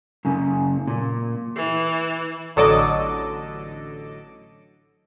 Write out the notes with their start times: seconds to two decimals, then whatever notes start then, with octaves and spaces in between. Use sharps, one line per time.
0.25 F#2 C#3
0.87 A#2
1.56 E3
2.56 A1 D3 F#3 A4 D#5 D6